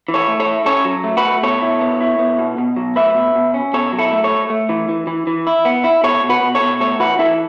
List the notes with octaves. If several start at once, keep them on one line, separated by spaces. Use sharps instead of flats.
E3
A4 C#5
A3
A4 C#5
E4
C#4 A4 C#5
F#3
A3
F#4 B4
A3
B2 A4 C#5
E4
B3
E4
B3
B2
B2
F#3
A3 B4 E5
B2
B2
C#4
B2 A4 C#5
F#3
E4 A4
A3
A4 C#5
A3
A3
E3
E3
E3
E3
E4
B3
E4
B2 A4 C#5
B2
F#4 B4
B2
A4 C#5
B2
A3 A4 C#5
E3 F#4 B4
E3 E4 A4